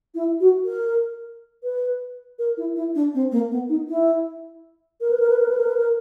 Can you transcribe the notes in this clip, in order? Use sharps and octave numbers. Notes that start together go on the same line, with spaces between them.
E4
F#4
A#4
B4
A#4
E4
E4
D4
C4
A#3
B3
D#4
E4
A#4
B4
A#4
B4
A#4
B4
A#4
B4
A#4